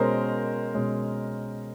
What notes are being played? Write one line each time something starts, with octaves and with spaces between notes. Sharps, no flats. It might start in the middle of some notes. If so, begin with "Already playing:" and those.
Already playing: B2 G#3 C#4 A#4 C5
B2 G#3 C#4